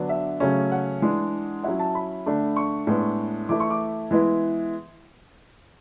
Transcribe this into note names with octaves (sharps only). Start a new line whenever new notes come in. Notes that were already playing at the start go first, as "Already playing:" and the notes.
Already playing: D3 F#3 B3 D4
E5
C#3 F#3 A3 C#4
F#5
E3 G#3 D4
F#3 C#4 E4 F#5
A5
B5
D3 A3 D4
C#6
A2 G#3 B3 D4
E3 A3 E4 D6
C#6
D6
E3 G#3 B3 E4